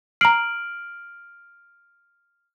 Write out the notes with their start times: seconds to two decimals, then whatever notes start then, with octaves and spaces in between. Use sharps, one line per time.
0.21 A#5 F6 C7 D7 F#7